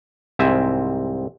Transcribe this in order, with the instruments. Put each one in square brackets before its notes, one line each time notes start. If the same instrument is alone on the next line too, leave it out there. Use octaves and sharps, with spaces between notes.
[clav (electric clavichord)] C2 G#2 C4 E5 G#5